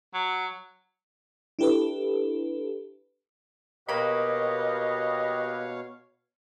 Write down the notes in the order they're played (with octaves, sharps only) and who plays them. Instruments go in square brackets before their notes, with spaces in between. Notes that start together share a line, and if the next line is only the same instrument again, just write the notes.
[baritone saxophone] F#3
[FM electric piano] D4 E4 G4 A4 B4
[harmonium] B2 C#5 F5 [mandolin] A#3 B5 [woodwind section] G4 B4 [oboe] D#5